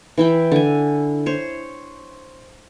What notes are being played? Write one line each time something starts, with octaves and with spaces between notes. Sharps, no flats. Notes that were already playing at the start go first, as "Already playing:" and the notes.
E3 E4 G5
D3 G#5
C5 C#5